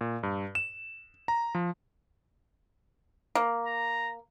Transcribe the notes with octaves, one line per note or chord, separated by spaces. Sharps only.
A#2
G2
E7
A#5
F3
A#3
A#5